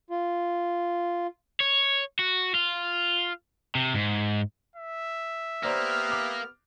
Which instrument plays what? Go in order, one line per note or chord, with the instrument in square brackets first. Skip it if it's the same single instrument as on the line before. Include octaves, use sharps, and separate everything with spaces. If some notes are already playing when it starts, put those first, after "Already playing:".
[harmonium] F4
[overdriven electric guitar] C#5
F#4
F4
C3
G#2
[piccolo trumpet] E5
[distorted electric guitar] A#3 [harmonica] B3 G4 F6 [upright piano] C5 D5 A#5
[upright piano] D6